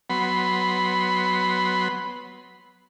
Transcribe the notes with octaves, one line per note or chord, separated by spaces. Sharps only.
F#3 B3 B5 C6